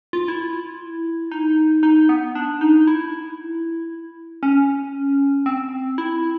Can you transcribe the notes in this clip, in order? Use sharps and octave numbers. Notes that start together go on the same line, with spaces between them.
F4
E4
D#4
D#4
B3
D4
D#4
E4
C#4
C4
E4